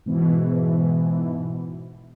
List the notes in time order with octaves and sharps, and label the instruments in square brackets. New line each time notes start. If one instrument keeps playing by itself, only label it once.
[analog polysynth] G#2 B2 E3